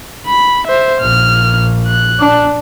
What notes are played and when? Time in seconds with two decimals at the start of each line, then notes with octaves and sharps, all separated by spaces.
0.27 B5
0.67 C5 E5
1.01 A#1 F6
1.87 F#6
2.19 D4